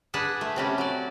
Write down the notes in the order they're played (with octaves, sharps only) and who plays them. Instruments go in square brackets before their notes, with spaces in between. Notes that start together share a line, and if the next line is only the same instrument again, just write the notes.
[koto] D4 G#4 B4 F#5 A5
A3
C3 G3 C#4
F#3 D5